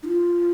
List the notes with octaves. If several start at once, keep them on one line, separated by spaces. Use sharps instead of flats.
D#4
F4